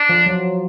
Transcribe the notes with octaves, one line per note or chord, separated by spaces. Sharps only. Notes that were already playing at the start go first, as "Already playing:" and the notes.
Already playing: D4
F3
F#3